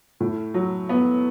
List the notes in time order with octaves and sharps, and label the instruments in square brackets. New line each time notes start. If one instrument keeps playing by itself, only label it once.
[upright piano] A2
F#3
B3